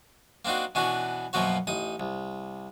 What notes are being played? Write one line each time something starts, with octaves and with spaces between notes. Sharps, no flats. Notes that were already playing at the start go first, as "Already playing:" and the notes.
A#3 C4 D4 D#4 F#4
B2 E3 C#4 D4 F#4
F#2 B2 F3 A#3 F#4 C#5
A1 D#4 D#6
C2